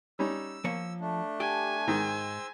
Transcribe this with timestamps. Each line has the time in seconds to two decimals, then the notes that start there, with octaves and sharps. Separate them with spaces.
0.19 G3 C#4 D#4 E6
0.64 F3 A#3 C#5
1.00 A3 D4
1.40 G4 G#5
1.88 G#2 D#3 G#3 C5 E6